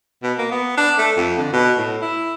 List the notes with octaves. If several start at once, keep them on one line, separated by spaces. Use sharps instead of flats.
B2
A#3
B3
D4
A3
F2
D3
B2
A2
E4